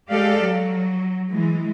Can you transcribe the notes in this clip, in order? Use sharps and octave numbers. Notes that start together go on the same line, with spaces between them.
G#3 G4 A4 D5 F5
F#3
E3 G#3